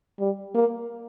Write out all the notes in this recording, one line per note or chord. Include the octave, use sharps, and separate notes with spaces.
G3
A#3